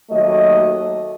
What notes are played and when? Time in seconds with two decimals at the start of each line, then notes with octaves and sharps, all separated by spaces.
0.10 D#2 F#3 A3 D#5